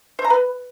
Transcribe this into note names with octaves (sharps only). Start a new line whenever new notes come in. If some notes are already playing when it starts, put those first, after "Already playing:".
C5
A#5
B4